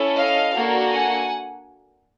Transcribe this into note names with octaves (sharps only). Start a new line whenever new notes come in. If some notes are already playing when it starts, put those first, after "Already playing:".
Already playing: C#4 E4 A4
D#5 F5
A#3 D4 F#4 A4
F#5 G#5